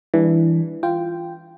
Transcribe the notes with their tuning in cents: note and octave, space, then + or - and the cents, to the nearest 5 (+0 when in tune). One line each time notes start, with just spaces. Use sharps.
E3 +0 G3 +40 D4 +0
F4 -15 G5 +0